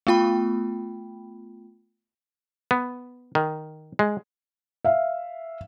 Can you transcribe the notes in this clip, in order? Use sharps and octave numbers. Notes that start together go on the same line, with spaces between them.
A3 B3 F4 G5 B5
B3
D#3
G#3
E5 F5